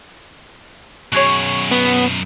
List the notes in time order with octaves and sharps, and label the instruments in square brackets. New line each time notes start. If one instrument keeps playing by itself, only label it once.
[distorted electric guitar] F#2 B2 [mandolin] F#4 G#4 C#5
[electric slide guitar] B3